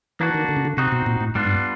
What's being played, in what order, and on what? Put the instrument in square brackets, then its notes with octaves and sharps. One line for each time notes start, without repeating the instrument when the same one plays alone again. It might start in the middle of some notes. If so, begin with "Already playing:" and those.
[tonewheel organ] E3 [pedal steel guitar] A#3 D4 F#4
[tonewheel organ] D#3
D3
C#3
D3
[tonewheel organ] C3 [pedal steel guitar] C4 D#4 F#4
[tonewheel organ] B2
A#2
A2
[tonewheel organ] G#2 [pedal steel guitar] G3 B3 D4 F4
[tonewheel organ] G2